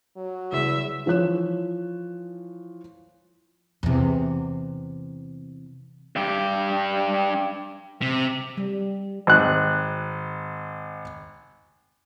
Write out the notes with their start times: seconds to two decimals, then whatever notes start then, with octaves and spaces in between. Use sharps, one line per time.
0.17 F#3
0.52 E2 C#3 G3 E5
1.06 E3 F3 C#5 F#6 E7
3.83 E2 C3
6.16 G2 G4
8.02 C3
8.57 G3
9.27 G#1 F#6